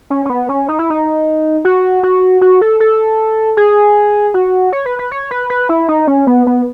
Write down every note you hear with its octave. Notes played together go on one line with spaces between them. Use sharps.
C#4
C#4
B3
C#4
D#4
E4
D#4
F#4
F#4
F#4
A4
A4
G#4
F#4
C#5
B4
B4
C#5
B4
B4
E4
D#4
C#4
B3
B3